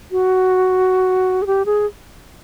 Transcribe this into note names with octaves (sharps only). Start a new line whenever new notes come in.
F#4
G#4
G4
G#4